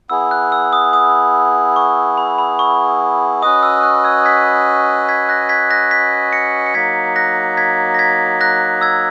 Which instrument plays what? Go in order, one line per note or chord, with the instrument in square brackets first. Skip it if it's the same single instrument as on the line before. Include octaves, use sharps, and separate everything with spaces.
[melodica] B3 E4 G#4 [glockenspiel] E6
[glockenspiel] F#6
E6
D#6
D#6
C#6
B5
B5
C#6
[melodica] C#4 F#4 B4 D#5 [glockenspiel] D#6
[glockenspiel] E6
F#6
E6 G#6
G#6 B6
G#6 B6
F#6 A#6
G#6 B6
F#6 A#6
G#6 B6
A#6 C#7
C#7
[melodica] F#3 A#3 D#4 [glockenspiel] G#6 B6
[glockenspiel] F#6 A#6
G#6 B6
A#6
G#6 B6
F#6 A#6
E6 G#6